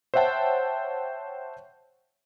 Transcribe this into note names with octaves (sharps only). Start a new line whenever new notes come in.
C5 C#5 E5 F#5 G5 A5